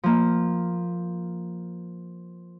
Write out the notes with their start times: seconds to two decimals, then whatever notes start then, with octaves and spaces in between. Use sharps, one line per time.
0.04 F3 A#3